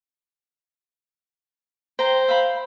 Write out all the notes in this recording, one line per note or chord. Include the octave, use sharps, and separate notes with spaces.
C5 G5 A#5
E5 F5 B5